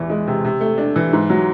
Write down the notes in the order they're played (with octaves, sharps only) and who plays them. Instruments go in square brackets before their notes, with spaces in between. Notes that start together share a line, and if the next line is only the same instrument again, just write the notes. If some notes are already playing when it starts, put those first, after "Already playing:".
Already playing: [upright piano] E2 E3
G#3
C3
C3
A3
D4
E3
G#2
F#3